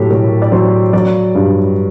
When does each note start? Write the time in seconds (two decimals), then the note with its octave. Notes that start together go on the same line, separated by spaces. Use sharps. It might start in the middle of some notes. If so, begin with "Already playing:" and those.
Already playing: A2 F#3 G4 A4
0.10 A2 A#4
0.42 D5
0.52 F#3 C5
0.93 F#3 D5
1.35 G2